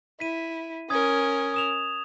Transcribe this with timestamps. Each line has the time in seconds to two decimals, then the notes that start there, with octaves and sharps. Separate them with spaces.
0.20 E4 B6 D#7
0.90 C#4 A#4 D#6 G#6
1.54 D#6 E7 F7